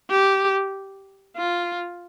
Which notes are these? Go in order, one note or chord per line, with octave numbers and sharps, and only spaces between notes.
G4
F4